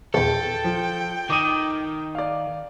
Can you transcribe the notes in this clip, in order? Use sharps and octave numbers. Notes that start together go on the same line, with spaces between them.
A#1 E2 A4 G5
F3
D#3 D6 D#6 D#7
D5 F5